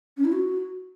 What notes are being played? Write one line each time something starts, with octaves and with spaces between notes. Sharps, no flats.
C#4
E4
F#4